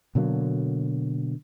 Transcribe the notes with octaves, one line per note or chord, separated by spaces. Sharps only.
B2 D3 F#3 A#3